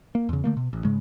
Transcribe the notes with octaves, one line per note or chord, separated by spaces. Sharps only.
A#3
E2 C#3
D3 A3 A#3
B2
A1
G#2 C#3 G#3